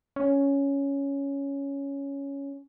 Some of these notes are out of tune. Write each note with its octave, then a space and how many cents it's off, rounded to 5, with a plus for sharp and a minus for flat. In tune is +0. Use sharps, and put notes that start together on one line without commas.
C#4 +5